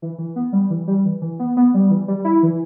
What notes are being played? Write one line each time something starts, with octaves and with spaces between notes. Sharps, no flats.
E3
E3
B3
G3
E3
G3
E3
E3
B3
B3
G3
E3
G3
E4
E3